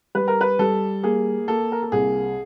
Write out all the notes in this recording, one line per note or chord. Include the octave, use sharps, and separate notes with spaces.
G3 B4
A#4
B4
G3 A4
A#3 G#4
A#3 A4
A#4
A4
C2 G#4